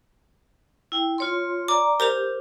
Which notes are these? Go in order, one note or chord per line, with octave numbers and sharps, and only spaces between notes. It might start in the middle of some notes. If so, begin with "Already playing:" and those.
E4 G5
F4 C#5 C6
D5 A#5 D6
G4 A#4 C5 F7